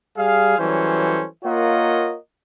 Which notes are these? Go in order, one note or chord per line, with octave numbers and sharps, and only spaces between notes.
G3 G#4 F5
E3 F#3 G3 C#4 A4 C5
A#3 F4 A#4 C#5 D#5 F#5